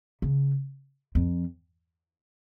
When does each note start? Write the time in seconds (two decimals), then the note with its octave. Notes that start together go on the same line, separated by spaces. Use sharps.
0.22 C#3
1.15 F2